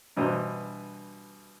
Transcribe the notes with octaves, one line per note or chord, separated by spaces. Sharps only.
G2 B2 E3 D4 C5 A#5